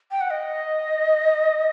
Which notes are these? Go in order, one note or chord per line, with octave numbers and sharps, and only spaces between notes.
G5
F#5
D#5